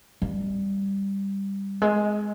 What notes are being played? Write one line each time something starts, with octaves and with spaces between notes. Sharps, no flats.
G3
G#3